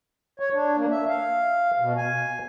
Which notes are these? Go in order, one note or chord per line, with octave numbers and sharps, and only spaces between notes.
C#5
D4
A#3
E5
F5
B2
G#5